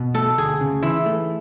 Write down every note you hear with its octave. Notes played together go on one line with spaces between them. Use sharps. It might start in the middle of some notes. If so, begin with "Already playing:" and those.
Already playing: B2
A3 A4
D2 G#4
C#3
E3 E4
A3